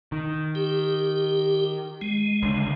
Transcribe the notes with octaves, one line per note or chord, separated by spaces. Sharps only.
D#3
G4
G#3
C#2 D3